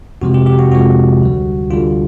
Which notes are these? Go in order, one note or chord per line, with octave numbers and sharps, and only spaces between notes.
F2 C3 F3 G#3 F#4
G4
G4
F#4
F2 C3 F3 G#3 F#4
D2 D3 G3
D2 D3 G3 F4